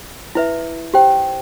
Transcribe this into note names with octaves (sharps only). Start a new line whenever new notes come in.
E4 B4 E5
G4 C5 G5